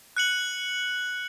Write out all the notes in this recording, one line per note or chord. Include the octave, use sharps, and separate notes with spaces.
F#6 C#7 F#7